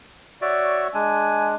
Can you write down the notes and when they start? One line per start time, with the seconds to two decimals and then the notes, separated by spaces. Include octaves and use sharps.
0.41 F#4 C#5 D5 E5
0.94 G#3 D4 G#5